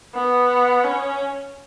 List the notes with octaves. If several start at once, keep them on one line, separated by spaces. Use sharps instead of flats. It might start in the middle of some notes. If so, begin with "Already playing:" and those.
B3
C#4